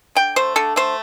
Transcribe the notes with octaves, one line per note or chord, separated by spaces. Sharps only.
D3 G5
A3 C5
D3 A4
A3 C5